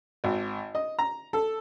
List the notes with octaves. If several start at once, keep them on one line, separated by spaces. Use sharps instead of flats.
G#1
D#5
A#5
A4